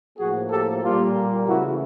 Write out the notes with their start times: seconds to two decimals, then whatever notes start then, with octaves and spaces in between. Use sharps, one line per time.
0.18 A2 F3 A#3 F#4 G#4
0.50 G4 A4
0.82 A#2 G3 A#3 F4 G4
1.47 C#3 E3 A3 E4 F#4